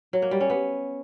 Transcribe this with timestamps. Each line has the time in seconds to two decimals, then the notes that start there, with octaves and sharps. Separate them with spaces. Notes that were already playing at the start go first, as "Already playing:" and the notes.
0.13 F#3
0.22 A#3
0.31 G3
0.41 C#4
0.50 B3